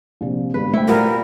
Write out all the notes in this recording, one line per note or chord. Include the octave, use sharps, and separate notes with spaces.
A#1 C3
G1 G#2 G4 B4
A3 E4 C5 E5 G5
A#2 G3 B3 A#4